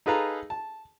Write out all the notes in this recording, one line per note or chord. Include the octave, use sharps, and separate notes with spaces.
D#4 G#4 A4 B4 F5 A#5
A5